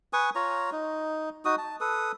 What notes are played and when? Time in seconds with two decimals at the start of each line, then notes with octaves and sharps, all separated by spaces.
0.13 B4 G#5 C#6 D#6
0.35 F4 C#5 A#5
0.72 D#4
1.45 D#4 F#4 D#6
1.58 A5
1.81 A4 B4 D#6